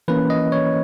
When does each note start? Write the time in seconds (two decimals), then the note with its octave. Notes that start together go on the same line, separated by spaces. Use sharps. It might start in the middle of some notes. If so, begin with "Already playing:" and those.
0.08 E3 A#3 C#4 B4
0.30 D#5
0.52 C#5